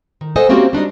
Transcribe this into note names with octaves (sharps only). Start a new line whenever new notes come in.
D#3
A4 C5 D#5 F#5 G#5
A3 A#3 C4 C#4 F#4 G4
G3 D4 D#4 D#5